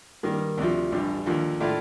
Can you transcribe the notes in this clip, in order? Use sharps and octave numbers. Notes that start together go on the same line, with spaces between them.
G2 D#3 A#3
D2 C3 F3
A1 G2 D3
D#2 D3 F3
A2 A3 D4 F4